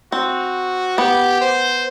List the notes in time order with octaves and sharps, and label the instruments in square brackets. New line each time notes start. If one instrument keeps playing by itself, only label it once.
[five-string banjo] C4 [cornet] F#4
[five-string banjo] B3 [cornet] G4
[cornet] C5